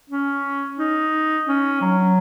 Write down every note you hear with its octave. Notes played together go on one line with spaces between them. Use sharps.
C#4
D#4
C#4
F#3